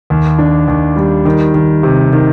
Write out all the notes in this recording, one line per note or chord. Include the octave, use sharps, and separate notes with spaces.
D#2
D4
D#2
G3
D#3
D#3
C3
D#3